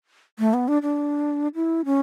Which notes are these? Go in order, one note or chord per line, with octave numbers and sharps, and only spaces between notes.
A3
B3
D4
D4
E4
C#4